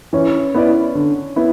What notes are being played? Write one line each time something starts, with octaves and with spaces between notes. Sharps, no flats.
E3 C#4
B3 E4 B4 D5
D3
B3 E4